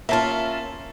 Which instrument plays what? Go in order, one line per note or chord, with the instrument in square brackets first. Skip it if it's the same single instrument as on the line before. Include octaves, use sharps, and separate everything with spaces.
[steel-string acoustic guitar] A#3 C#4 F4 [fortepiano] E5 A5